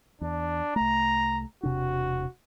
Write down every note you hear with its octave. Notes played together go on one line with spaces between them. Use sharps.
E2 D4
C2 A3 A#5
E1 C3 D4 F#4